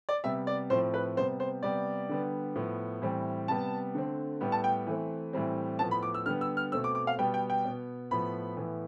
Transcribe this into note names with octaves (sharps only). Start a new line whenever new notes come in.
D5
C3 G3 B3 E5
D5
A2 F3 C4 C5
B4
C3 G3 B3 C5
C5
C3 G3 B3 D5
D3 G3 B3
A2 F3 B3
A2 E3 G3 C4
C3 G3 B3 A5
D3 A3 C4
A2 G3 B3
A5
G5
E3 A3 C4
A2 E3 G3 C4
A2 F3 B3 A5
B5
D6
E6
D3 G3 B3 F6
E6
F6
B2 A3 C4 E6
D6
D6
F5
B2 G3 B3 G5
G5
G5
B2 B3
A2 F3 B3 B5
A2 E3 B3